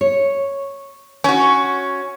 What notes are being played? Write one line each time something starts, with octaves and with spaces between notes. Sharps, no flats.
C#5
C#4 F#4